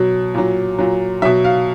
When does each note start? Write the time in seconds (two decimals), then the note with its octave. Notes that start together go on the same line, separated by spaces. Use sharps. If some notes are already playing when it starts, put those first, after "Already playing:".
Already playing: B2 F#3
0.34 A#2 F#3
0.78 A#2 F#3
1.22 B2 F#3 E5
1.44 F5